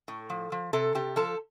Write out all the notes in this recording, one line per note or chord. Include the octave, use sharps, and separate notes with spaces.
A2
F3
F3
C3 A4
C3 G4
F3 A4